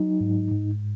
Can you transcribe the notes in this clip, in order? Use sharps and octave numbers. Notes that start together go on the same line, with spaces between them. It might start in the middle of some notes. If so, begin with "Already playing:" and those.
Already playing: F#3 D#4
G#2
G#2